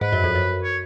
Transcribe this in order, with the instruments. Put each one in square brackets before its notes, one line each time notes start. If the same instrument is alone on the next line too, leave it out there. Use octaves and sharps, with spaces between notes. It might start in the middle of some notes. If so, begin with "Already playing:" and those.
[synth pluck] G#2 [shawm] B4
[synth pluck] F#2
F2
F#2
[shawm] C#5